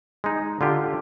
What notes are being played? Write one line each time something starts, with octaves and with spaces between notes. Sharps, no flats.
G#3 D#4
D3 F4 G4